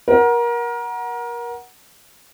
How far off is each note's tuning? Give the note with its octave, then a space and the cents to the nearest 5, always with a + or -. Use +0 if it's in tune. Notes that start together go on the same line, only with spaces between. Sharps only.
A#4 +25 F#5 +0